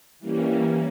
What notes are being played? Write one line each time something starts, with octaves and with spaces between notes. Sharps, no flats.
E3 G3 A#3 C#4